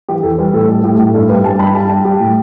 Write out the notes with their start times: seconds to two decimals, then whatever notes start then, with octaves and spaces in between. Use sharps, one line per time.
0.09 E3 G4
0.23 E2 A4
0.38 G3 B4
0.53 A2 A4
0.69 G3
0.84 A2 G4
0.99 A2
1.14 G2 A4
1.29 G3 B4
1.44 G3 A5
1.59 G2 B5
1.75 G3 A5
1.89 G3
2.05 G3 G4
2.20 A2